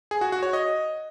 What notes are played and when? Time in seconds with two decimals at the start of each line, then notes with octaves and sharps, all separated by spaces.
0.11 G#4
0.21 F#4
0.32 F#4
0.43 C#5
0.53 D#5